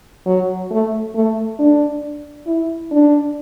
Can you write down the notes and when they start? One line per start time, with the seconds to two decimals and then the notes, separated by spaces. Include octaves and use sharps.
0.26 F#3
0.71 A3
1.15 A3
1.59 D4
2.47 E4
2.91 D4